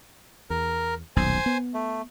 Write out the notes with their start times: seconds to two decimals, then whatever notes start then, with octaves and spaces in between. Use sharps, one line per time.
0.50 E2 A#4
1.16 D#1 B1 C5 G#5
1.46 B3
1.74 A3